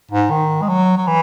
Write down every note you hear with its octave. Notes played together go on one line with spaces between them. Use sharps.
G#2
D#3
G#3
F#3
F#3
E3